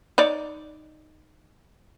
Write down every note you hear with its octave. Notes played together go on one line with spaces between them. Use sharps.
D#4 C#5 D5